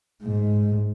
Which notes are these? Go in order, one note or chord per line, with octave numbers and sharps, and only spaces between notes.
G#2